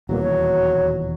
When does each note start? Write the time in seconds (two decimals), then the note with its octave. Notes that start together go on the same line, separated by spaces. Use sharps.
0.09 D#1 E2 B2 F#3 A#3
0.22 C#5